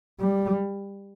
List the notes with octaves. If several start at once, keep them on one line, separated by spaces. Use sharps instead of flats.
G3